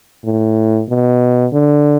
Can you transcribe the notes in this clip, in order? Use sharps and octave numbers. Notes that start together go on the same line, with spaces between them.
A2
B2
D3